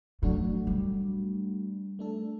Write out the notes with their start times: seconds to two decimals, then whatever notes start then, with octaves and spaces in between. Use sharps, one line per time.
0.22 A2 F#3 A3 D4 F#4
0.67 G3
1.99 A3 D4 A4